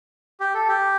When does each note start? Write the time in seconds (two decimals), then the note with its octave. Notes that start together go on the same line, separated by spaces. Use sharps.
0.40 G4
0.54 A4
0.68 G4